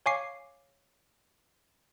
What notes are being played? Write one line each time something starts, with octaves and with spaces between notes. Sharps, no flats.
C#5 F5 G#5 C#6 D6 C7